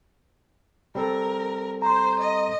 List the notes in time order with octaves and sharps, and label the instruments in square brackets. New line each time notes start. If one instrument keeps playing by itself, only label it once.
[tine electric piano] G3 C4 A4 [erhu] A#4
[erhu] C5 [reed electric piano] A#5 C6
[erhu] D#5